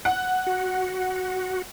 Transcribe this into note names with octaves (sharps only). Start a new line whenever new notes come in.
F#5
F#4